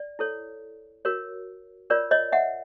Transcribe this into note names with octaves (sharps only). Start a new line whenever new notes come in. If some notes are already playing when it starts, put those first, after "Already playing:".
Already playing: D5
E4 A4 C#5
F#4 A#4 C#5
F4 A#4 C#5 D5
C#5 D#5
E5 F#5